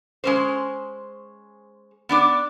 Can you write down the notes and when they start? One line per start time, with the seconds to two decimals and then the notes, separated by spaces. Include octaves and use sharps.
0.24 G#3 C#4 C5
2.09 B3 D4 D5